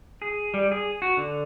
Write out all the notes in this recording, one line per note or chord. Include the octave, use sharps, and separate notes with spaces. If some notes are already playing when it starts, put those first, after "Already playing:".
G#4
G3
G#4
F#4
D3